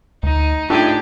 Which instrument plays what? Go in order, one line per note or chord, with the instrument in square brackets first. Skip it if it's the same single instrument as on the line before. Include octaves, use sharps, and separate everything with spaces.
[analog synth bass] D2 [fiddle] D#4
[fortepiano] A2 D4 [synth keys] A3 D#4 G#4 [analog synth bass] F4 [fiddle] G4